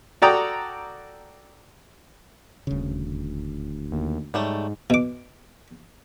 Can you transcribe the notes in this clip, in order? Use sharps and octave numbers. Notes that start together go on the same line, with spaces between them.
F#4 A4 D5 G5 A#5 D#6
D#1 D2 C#3
D#2
G#2 F#3 G3 A3
B2 D6